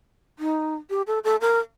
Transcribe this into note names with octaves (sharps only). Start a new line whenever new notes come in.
D#4
G4
A4
A4
A#4